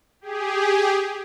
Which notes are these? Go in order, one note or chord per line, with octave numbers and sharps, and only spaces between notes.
G4 G#4